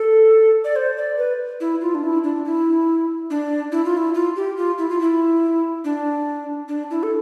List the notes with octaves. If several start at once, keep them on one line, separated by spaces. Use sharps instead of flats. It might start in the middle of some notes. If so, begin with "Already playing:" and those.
Already playing: A4
D5
C5
D5
B4
E4
F4
D4
E4
D4
E4
D4
E4
F4
E4
F4
G4
F4
E4
F4
E4
D4
D4
E4
A4